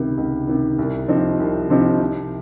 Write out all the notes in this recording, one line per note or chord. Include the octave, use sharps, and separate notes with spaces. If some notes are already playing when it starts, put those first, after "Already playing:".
Already playing: C#2 C3 D#3
C#2
C3 D#3
C2
C3 F3 C4 D#4
C2
C3 F3 C4 D#4
C3